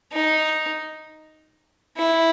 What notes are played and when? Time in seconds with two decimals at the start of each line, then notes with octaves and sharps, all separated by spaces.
0.13 D#4
1.97 E4